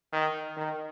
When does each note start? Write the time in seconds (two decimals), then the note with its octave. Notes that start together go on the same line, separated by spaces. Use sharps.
0.13 D#3
0.57 D#3